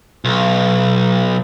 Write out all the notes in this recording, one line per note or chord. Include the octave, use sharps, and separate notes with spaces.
B1